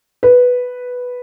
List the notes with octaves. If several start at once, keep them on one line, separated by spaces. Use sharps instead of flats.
B4